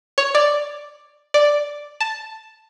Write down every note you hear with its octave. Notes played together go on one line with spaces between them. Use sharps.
C#5
D5
D5
A5